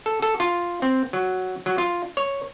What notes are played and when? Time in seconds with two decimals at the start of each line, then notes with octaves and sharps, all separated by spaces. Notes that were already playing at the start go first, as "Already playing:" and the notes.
0.06 A4
0.22 A4
0.40 F4
0.82 C4
1.13 F#3
1.66 F#3
1.78 F4
2.17 C#5